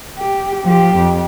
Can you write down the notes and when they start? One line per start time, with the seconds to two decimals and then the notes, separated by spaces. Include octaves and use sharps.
0.18 G4
0.64 F3 G4
0.97 F2